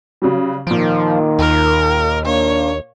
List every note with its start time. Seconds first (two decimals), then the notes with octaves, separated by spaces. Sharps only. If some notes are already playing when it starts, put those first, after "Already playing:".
0.22 C#3 F#3 G3
0.67 A#2 D#3 F3 D7
1.39 D#2 A#4
2.25 A#3 D4 C#5